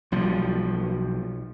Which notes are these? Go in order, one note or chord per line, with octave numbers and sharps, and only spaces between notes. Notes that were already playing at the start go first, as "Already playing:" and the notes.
B1 F3 G3